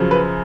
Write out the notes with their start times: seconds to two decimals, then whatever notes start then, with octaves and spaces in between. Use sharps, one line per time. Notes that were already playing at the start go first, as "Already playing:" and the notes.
Already playing: F#2 C#3 F3
0.11 B4